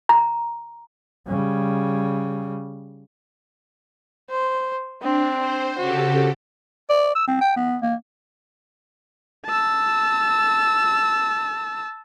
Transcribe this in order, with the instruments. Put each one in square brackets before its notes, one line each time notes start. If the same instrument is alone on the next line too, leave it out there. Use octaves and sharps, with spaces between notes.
[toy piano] A#5
[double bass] C#3 G3
[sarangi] C5
[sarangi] C4 [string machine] D4
[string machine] C5
[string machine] C#3 G4 A4 [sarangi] F#4
[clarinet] D5
E6
C4
G5
B3
A#3
[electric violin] A5 E6